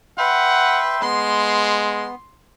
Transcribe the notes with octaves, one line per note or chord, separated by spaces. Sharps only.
B4 E5 F#5 G5 C6
G#3 B3 C6